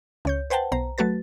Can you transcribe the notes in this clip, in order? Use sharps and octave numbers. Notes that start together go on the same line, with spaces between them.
C#2 C#5 G6
B4 C5 F#5 G5 A5
B1 C5 A#5
F#3 A3 F#4 B4 A6